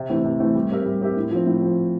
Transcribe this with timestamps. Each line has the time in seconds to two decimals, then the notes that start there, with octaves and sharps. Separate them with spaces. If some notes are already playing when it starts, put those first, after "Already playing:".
Already playing: C3
0.10 E3 A3 C4
0.24 C3
0.40 E3 A3 C4
0.55 G3
0.71 C4 G4 A#4 E5
0.85 G3
1.01 C4 G4 A#4 E5
1.16 A2
1.31 F3 C4
1.46 A2
1.62 F3 C4